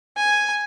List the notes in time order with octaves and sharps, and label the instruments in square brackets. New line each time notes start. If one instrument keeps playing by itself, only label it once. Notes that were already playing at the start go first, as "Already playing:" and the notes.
[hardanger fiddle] G#5